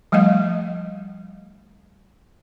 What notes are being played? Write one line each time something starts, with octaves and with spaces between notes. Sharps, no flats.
F3 G3 A3 D#5 F5